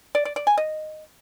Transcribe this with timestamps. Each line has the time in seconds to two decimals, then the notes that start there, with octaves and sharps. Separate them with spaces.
0.15 D5
0.25 D5
0.36 D5
0.47 G#5
0.58 D#5